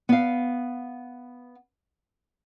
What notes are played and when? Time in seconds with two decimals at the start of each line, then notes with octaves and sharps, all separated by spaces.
0.09 B3 F5